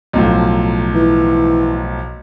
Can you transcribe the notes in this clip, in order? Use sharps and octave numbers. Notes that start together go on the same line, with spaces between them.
B1 A2 F3
E3